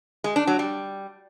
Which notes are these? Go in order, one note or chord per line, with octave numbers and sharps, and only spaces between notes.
G#3
D4
F#3
G3